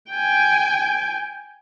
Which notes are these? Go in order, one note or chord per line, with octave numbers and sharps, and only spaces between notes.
G5 G#5